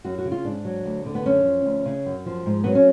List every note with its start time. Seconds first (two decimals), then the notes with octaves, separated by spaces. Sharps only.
0.04 F#2 F#4
0.18 F#4
0.25 C#3
0.32 F4
0.44 G#2 D4
0.65 F#3
0.85 D2
1.06 D3
1.15 B3
1.26 F#2 C#4
1.45 F3
1.65 D2
1.85 C#3
2.06 F#2
2.26 F3
2.46 G#2
2.64 F#3 B3
2.75 C#4